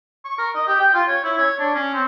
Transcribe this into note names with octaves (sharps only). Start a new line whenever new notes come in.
C#6
A#4
D#5
G4
G5
F4
C#5
E4
C#5
D4
C#4
C4